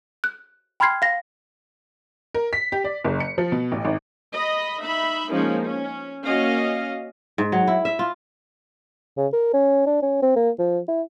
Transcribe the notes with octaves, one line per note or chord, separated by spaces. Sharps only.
F#6
G5 B5 C6 F6 G#6 C7
F5 A#6
A#4
B6
G4
D5
F#1
C#7
F3
B2
A1
G#1
D#5 B5
D#4 E5 B5
F3 G#3 A#3 C#4 D#4
C#4
A#3 C#4 F#4 D#5 F5
G#2
F#3
E4
E5
F4
C#3
A#4
C#4
D4
C#4
C4
A#3
F3
E4